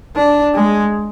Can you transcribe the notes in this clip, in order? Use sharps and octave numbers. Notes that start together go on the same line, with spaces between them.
D4
G#3